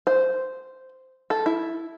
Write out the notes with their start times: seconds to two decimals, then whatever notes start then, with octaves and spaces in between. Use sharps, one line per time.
0.07 C5
1.30 A4
1.46 E4